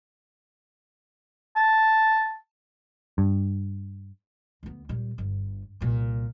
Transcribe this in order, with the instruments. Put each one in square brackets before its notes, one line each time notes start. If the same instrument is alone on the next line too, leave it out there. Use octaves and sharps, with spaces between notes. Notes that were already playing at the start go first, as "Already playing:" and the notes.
[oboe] A5
[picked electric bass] G2
[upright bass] D2 B3
A#2 G3
G1
C2 A#2